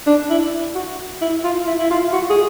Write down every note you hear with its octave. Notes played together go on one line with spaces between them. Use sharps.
D4
E4
F#4
E4
F4
E4
E4
F4
F#4
G#4